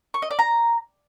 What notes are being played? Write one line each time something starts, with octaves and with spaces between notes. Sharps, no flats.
C#6
D#5
D5
A#5